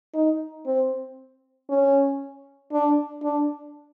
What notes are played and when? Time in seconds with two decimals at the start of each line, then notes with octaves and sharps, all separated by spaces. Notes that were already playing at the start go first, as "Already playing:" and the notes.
0.15 D#4
0.66 C4
1.70 C#4
2.73 D4
3.23 D4